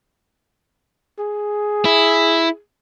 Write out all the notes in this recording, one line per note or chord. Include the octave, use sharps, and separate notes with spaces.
G#4
E4